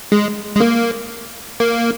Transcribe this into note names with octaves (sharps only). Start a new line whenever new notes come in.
G#3
G#3
A#3
A#3